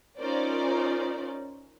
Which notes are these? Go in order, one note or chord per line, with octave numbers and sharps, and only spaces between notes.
C#4 D#4 F4 A#4 C5 D5